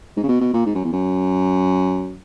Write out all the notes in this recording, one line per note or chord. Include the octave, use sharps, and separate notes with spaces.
G#2
C#3
B2
B2
A#2
G#2
F#2
E2
F#2